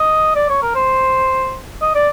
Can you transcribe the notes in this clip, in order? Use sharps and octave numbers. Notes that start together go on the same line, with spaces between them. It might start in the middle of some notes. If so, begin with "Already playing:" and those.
Already playing: D#5
D5
C#5
A#4
C5
D#5
D5